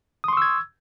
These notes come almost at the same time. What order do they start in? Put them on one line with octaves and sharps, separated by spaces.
D#6 C6 C#6 E6 G#6